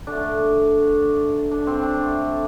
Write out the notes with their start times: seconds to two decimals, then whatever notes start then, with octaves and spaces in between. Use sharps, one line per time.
0.07 D3 A3 D4
1.51 D4
1.67 C4
1.83 D4
2.00 D3 A3